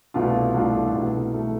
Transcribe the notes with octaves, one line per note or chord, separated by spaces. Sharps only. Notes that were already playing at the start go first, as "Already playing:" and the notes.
C2 B2 A3 D4 F4
C2 B2 A3 D4 F4
C2 B2 A3
B2 A3